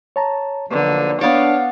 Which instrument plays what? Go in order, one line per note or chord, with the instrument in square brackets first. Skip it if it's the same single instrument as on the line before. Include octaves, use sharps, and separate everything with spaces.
[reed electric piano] C#5 A5 A#5
[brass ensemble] B1 F3 A#3 [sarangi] D3 [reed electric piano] B4
[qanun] B3 D5 [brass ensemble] D4 F5 [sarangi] C#5